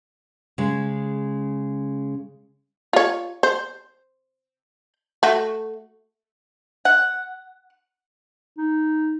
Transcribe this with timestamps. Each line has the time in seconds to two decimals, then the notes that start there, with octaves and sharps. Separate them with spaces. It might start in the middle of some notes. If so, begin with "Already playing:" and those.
0.58 C#3 G#3
2.93 F4 C#5
3.43 C5
5.23 A3 F#4
6.85 F#5
8.57 D#4